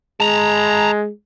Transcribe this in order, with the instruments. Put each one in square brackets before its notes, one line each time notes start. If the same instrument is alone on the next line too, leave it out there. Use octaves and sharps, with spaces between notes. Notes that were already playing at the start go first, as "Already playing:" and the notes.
[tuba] G#3 [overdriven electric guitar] A5 A#5